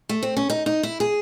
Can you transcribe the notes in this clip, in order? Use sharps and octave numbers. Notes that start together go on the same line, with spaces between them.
A3
C4
C#4
D#4
D#4
E4
G#4